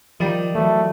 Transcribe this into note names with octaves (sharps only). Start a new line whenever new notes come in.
D#3 F3 G3
E3 F#3 A3